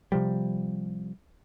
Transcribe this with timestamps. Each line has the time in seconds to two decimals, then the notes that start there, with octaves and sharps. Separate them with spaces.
0.12 C3 F3 G3